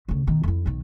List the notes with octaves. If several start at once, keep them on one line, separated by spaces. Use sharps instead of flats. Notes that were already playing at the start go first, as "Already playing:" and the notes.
D2 C#3
B2 D#3
F2 E4
B1 D#3